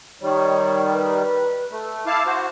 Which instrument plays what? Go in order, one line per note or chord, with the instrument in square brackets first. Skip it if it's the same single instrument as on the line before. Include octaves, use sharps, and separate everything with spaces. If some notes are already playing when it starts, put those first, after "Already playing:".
[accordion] D#3 G3 [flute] C#5
[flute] B4
[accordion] A3
[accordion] E4 F5 A5 [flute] D6
[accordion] F#4 C5